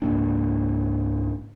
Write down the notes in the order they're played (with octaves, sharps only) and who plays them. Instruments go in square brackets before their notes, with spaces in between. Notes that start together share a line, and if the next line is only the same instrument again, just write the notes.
[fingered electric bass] C#2 G#2 A#3 D4